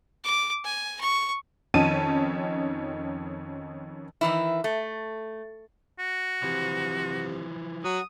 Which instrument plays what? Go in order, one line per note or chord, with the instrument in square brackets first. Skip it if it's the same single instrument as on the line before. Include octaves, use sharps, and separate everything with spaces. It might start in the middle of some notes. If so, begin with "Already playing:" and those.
[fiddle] D6
G#5
C#6
[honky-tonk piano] F2 D#3 C#4 D#4 A5 D#7
[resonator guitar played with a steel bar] D#3 E3 E4
A3
[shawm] F#4
[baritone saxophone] C3 [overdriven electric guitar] E3 F3
[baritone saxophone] F#3 [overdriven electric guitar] F#4 [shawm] D#6